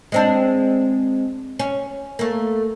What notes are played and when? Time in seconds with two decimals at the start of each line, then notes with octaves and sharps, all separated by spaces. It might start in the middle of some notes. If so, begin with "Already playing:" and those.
0.12 G#3 C4 D4
1.60 C#4
2.19 A3 A#3